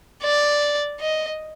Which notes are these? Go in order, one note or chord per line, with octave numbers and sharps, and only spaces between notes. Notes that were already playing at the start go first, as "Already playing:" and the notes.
D5
D#5